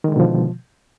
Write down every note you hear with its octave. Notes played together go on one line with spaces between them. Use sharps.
B2 D3 D#3 F3 G#3